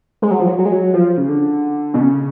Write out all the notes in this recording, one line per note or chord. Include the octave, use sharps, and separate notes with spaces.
G#3
F#3
F3
F#3
F#3
G#3
F#3
F3
C#3
D3
B2
C#3